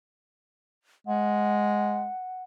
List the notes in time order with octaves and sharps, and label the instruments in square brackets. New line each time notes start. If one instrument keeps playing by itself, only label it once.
[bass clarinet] G#3 [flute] F#5